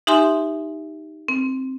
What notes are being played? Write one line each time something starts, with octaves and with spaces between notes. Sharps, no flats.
D#4 G4 E5 G#5 C6
C4